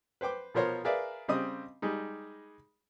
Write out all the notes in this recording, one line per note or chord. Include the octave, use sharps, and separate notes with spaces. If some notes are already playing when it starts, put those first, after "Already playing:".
B4 C5 G5 D6
B2 F3 A#4 C5 C#5 A#5
G#4 A#4 B4 D5 E5 F5
C#3 G3 C4 D#5 D#6
G3 G#3 D#4